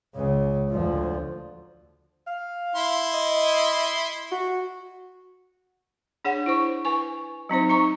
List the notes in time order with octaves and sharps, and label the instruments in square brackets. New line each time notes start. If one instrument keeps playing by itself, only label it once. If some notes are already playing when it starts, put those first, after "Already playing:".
[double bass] C#2 C#3
D2 F3
[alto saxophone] F5
[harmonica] E4 C6
[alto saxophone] D#5
F#4
[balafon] D4 G#4 C#5 F#5
E4 C5 C#6
B4 G#5 C#6
F#3 C4 D#4 C5
D#4 A#5 C#6